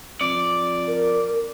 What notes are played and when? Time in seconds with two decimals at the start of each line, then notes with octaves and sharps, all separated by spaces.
0.21 F2 D5
0.88 A#4